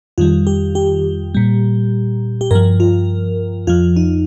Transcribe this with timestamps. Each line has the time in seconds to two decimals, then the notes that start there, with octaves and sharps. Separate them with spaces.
0.18 F2 D#3 G3 F4
0.47 G4
0.75 G4
1.35 A#2 G3
2.41 G4
2.51 G2 F3 A#4
2.80 F4
3.67 F2 F3 F4
3.96 D#4